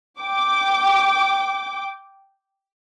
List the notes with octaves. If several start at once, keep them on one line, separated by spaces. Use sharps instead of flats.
G5 D6